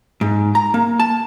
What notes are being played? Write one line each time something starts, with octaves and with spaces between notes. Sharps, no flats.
G#2
A#5
A#3
A5